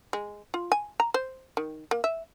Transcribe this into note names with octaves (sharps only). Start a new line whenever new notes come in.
G#3
F4
G#5
A#5
C5
D#3
A#3
E5